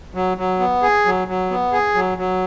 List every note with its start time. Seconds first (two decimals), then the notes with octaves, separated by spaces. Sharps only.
0.14 F#3
0.37 F#3
0.59 B3
0.83 G#4
1.05 F#3
1.28 F#3
1.50 B3
1.72 G#4
1.94 F#3
2.18 F#3